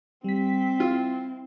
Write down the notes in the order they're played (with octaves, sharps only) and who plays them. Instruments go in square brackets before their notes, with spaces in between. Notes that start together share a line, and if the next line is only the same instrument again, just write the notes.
[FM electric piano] G3 B6 [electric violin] C4
[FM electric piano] E4 [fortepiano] F4